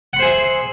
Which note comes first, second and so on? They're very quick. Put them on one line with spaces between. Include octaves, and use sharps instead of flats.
F#5 B5 C5 G#4 E5